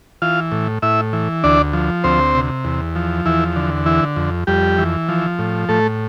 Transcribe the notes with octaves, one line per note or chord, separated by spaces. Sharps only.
E3 F4 F5
A2
A2 E4 E5
E3
D2 D4 D5
F3
D2 C4 C5
C3
E2
F3
E2 E3 E4
D3
E3 E4
F2
F2 G3 G4
E3
F3
A2
A2 A3 A4